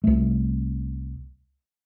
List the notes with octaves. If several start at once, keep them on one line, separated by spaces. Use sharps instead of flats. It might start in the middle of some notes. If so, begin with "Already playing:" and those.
C2 A3